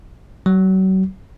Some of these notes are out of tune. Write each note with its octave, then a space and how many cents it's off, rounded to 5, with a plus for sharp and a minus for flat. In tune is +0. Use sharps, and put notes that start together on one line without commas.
F#3 +35